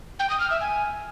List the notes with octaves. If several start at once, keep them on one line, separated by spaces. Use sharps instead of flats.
G5
D#6
F6
E5
G#5